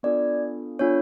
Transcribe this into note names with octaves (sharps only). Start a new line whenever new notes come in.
B3 D4 F4 A4 D5
B3 D4 F4 A4 C#5